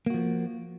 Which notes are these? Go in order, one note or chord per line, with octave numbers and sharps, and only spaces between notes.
F3 A#3 F#4